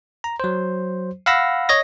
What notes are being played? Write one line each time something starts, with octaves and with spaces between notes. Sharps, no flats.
A#5
F#3 C5
F5 F#5 B5 E6 A#6
C#5 D#5 A#6